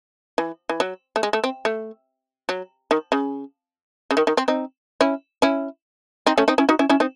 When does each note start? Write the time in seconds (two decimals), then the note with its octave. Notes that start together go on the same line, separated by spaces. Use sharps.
0.38 E3
0.69 E3
0.80 F#3
1.16 A3
1.23 G#3
1.33 A3
1.44 C4
1.65 A3
2.49 F#3
2.91 D#3
3.12 C#3
4.11 C#3
4.17 D#3
4.27 D#3
4.37 C4
4.48 C4 D#4
5.01 C#4 E4
5.42 C#4 E4
6.27 C4 D#4
6.38 A3 C#4
6.48 C4 D#4
6.58 C#4 E4
6.69 D#4 F#4
6.79 C#4 E4
6.89 C#4 E4
7.00 C4 D#4